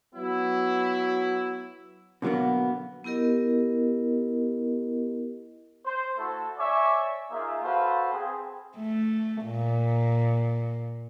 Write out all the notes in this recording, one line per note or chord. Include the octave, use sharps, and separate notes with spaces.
F#3 B3 E4
B2 D3 F#3 A#3 B3
B3 E4 G4 A#4 D#5
C5
A3 E4 F#4 A4
C#5 D5 E5 G#5 C#6 D6
A#3 D#4 F4 G#4 E5
F#4 A4 B4 C5 F5
C4 G#4
A3
A#2